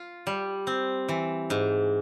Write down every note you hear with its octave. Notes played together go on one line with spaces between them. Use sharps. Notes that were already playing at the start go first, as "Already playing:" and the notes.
Already playing: F4
G3
C4
E3
G#2